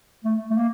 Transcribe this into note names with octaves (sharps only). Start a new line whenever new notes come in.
A3
A3
A#3